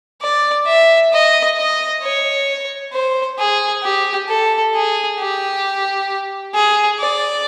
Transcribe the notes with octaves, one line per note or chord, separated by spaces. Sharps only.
D5
E5
D#5
D#5
C#5
C5
G#4
G4
A4
G#4
G4
G#4
D5